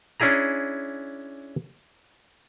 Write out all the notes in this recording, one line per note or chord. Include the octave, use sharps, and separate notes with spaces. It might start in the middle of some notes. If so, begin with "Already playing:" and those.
C#4 D4 E4 G#4 A#5